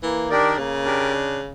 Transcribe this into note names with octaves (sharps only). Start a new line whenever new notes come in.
E3 A#3
D#3 D4 G4 A#4 D5
C#3 A#3
D4 G4 A#4 D5
D4